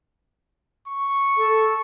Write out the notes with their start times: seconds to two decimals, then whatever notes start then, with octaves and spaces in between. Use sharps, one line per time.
0.87 C#6
1.37 A4